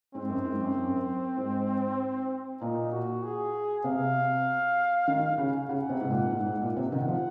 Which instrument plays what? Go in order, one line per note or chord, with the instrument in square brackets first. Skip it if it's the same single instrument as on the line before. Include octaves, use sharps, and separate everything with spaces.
[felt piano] G#2 [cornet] C4
[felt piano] F#2
G#2
F#2
F#2
G#2
[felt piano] A#2 [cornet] D#4
[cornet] F#4
G#4
[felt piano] C3 [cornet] F5
[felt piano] D#3
C#3
[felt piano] C#3 [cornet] F#5
[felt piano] C3
G#2
A#2
G#2
G#2
A#2
C3
[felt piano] D#3 [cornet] F#5
[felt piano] F3